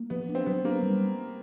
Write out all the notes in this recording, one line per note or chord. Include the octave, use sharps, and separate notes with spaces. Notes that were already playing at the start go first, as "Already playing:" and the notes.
Already playing: A#3
F3 B3
D4
C4
F#3 B3
A#3 D4
G3